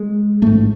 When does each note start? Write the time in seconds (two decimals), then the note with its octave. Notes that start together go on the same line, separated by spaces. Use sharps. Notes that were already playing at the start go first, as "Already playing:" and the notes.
Already playing: G#3
0.42 A1 G#2 A3